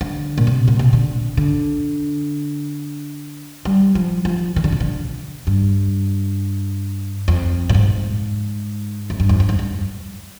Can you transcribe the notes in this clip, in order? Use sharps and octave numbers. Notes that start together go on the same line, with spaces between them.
D3
A#2
C3
A#2
C3
D3
D3
G3
F3
F3
D#3
D3
C3
D3
G2
F2
A#2
G#2
F2
G2
F2
G2
G#2
G2